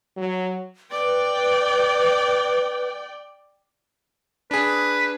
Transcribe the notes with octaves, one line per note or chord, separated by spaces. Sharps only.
F#3
B4 D5 G5
D4 G#4 B4